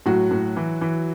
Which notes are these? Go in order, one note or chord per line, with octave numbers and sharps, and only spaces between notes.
A2 F#3 F#4
A2
E3
E3